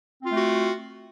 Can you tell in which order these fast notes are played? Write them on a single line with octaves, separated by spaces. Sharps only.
C4 F4 A3 F#4